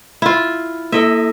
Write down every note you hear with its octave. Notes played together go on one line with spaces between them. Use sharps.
E4 F4
A#3 E4 A4 D#5 E5